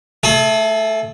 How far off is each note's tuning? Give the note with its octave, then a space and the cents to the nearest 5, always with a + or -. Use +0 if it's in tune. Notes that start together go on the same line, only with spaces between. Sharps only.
A3 +0 G#4 +40